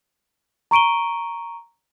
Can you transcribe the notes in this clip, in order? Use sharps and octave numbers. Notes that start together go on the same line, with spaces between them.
A#5 C#6 D7 D#7 G7